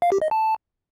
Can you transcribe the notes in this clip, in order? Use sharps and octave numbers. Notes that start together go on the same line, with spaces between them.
F5
G4
D#5
A5